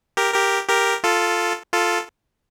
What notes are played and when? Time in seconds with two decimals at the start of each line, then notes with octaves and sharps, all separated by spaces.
0.17 G4 A#4
0.34 G4 A#4
0.69 G4 A#4
1.04 F4 A4
1.73 F4 A4